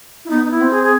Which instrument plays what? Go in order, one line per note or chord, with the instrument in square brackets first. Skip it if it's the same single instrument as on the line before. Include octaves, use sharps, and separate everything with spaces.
[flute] E4
[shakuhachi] B3 [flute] D#4
[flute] D#4
E4
[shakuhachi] C4
[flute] G#4
G#4